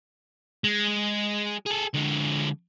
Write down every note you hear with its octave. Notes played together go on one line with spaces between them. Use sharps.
G#3
G#4 A4
D3 G#3